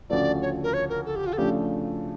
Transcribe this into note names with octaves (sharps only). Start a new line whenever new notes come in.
D2 C#3 F3 A3 D5
C#5
A#4
C#5
A#4
A4
G4
F4
A4
C#3 F3 A3 D4 G4